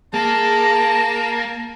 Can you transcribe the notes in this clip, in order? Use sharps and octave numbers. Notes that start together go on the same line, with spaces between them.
A#3 G#4 A5 A#5